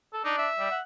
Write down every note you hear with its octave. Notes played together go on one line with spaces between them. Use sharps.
A4
D4 D#4
E5
G3
F#5